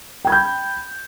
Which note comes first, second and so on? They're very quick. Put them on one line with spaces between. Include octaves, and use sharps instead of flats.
G5 G#6 B5 G6